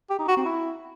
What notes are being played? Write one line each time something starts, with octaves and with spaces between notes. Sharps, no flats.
G4
D#4
F#4
C4
E4